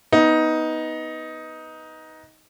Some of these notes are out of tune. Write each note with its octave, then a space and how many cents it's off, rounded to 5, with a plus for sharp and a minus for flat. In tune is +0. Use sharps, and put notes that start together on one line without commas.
B3 +0 D#4 +15